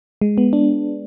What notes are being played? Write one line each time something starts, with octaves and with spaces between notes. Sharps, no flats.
G#3
B3
D4